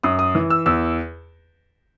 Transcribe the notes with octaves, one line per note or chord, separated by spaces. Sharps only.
F#2 D#6
D#6
E3
E6
E2 E6